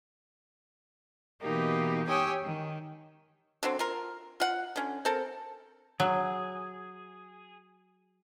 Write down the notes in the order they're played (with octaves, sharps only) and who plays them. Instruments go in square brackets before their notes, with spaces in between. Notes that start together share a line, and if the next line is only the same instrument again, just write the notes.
[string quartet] B2 E3 A#3 D#4 G4
G4 C#5 G5 G#5 D#6 E6
D#3
[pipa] D3 F#3 C4
F4 A#4
F4 F#5
D3 C#4
C4 A4 A#4
[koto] F#3 [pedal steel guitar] G#4